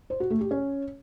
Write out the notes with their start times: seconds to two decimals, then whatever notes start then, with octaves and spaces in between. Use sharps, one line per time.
0.10 C5
0.20 F#4
0.30 A3
0.41 G4
0.51 C#4